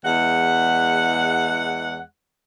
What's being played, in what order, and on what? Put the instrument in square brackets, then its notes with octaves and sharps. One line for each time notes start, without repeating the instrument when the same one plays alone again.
[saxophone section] E2 G#3 F#5